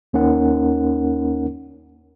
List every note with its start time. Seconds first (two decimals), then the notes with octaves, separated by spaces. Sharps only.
0.13 D#2 A#3 C#4 D#4 A#4 F#5